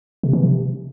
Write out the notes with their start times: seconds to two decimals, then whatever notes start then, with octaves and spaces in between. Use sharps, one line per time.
0.23 C3
0.33 E3
0.43 C3